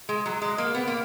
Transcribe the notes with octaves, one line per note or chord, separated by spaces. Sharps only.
G#3
F#3
G#3
A#3
B3
A#3